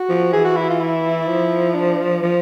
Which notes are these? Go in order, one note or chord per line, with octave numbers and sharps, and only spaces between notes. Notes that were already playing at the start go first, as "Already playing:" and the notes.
Already playing: F#4
F3
E3 G#4
F#4
E4
F4
E4
F3
D4
F3